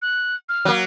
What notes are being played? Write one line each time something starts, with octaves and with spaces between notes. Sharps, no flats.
F#6
F6
F#3 A#3